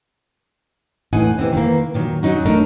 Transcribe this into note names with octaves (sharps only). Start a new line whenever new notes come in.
A2 E3 D#4 F#5 G#5
G#2 C3 E3 C4
D#3 E3 A#3
A#2 D#3 F#3
F#2 F#3 D#4 F#4
A3 D4 D#4 A#4